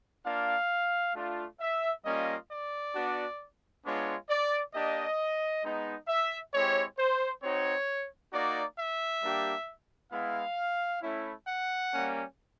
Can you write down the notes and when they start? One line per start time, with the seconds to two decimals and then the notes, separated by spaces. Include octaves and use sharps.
0.24 A#3 D4 F4 F5
1.14 A3 D4 F4
1.60 E5
2.04 G3 A#3 C#4 F4 D#5
2.49 D5
2.94 B3 D4 F#4
3.84 G#3 B3 D4 F4 C#5
4.29 D5
4.73 A#3 D4 G4 D#5
5.63 G#3 B3 D#4
6.08 E5
6.53 G#3 C4 E4 G4 C#5
6.98 C5
7.42 C4 D#4 F#4 C#5
8.32 A#3 D#4 F#4 D5
8.78 E5
9.22 G3 A#3 D4 G4
10.12 G#3 B3 E4 F5
11.02 A3 C#4 E4
11.46 F#5
11.91 G3 A#3 C#4